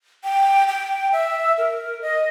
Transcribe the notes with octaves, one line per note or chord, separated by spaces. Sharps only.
G5
G5
E5
A#4
D#5